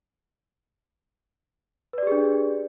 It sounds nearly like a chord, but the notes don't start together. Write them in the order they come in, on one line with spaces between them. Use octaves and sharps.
B4 D5 G4 G#4 D4